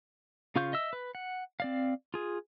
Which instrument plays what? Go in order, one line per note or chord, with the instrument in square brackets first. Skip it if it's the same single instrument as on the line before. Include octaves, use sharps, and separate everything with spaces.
[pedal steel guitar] C#3 F4 F5 C#6 G6
D#5 E5 E6
B4
F#5
C4 D5 F5
F4 G#4